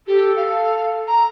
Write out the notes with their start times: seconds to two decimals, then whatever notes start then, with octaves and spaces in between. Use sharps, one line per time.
0.07 G4 A4
0.36 F5
1.08 A#5